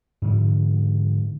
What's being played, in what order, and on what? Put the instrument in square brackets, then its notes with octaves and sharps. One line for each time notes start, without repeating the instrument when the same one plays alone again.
[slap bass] G#2 D3 F3 G#3